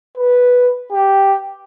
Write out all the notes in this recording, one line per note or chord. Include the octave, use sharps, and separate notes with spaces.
B4
G4